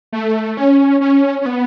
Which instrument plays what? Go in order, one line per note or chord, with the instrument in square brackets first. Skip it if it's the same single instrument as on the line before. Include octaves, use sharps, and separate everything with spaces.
[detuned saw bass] A3
C#4
C#4
C#4
B3